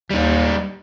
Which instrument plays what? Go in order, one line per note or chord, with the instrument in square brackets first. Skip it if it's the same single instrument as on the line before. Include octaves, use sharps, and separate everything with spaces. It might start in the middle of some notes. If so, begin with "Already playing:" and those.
[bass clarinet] D#2 [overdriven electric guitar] G3 D#4